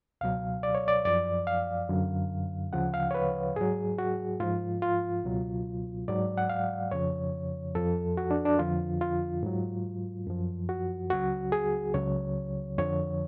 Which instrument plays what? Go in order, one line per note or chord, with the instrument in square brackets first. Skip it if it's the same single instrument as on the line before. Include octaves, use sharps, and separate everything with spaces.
[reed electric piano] C#2 B2 F#3 F5
D5
C#5
D5
F#2 F3 D5
F5
F#2 D3 F#3
D2 C#3 F3 F#5
F5
C#5
B4
G#2 F#3 G#4
F#4
G#2 F3 F4
F4
C#2 B2 F#3
G#2 F#3 D5
F#5
F5
F2 C#3 F3 C#5
F2 F3 A4
F#4
D4
D4
F2 D3 F3 F4
F4
G#2 F#3
F#2 F3
F#4
C#2 C#3 F#3 F#4
G#4
C#2 C#3 F#3 C#5
F2 D3 F3 C#5